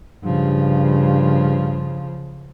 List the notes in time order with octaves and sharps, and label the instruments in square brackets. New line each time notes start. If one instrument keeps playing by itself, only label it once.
[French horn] G2 [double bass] C#3 F3